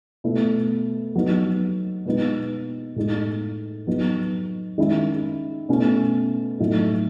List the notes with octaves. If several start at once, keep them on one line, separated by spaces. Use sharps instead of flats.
B2 A3 E4
F#3 B3 D#4
B2 G#3 B3 D#4
A2 G#3 D#4
F#3 B3 D#4
D#3 G#3 C#4 E4
B2 A3 C#4 E4
A2 F#3 A3 D#4